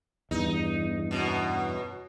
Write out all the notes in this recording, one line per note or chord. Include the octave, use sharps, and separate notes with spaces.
E2 G2 D#4
F#2 B2